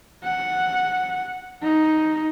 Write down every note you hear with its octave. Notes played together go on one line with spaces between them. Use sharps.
F#5
D#4